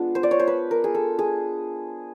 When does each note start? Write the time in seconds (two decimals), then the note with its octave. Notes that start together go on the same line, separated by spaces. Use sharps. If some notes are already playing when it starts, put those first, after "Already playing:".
Already playing: G#3 B3 D4 F4
0.15 C5
0.23 D5
0.31 C#5
0.39 C5
0.47 B4
0.71 A#4
0.84 G#4
0.95 A4
1.19 G#4